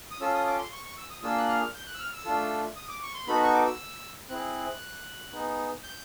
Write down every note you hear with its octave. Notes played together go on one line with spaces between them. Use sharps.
D#6
C#4 F4 A4 E6
D#6
D6
C6
C#6
C#6
E6
D#6
A#3 D4 F4 G#4 E6
F#6
F6
G6
F#6
E6
F6
E6
A3 D4 F4 A4
D#6
D6
C#6
C6
B3 D#4 F#4 A4 B5
C#6
D6
E6
C4 E4 G#4 F#6
B3 D#4 G#4
G6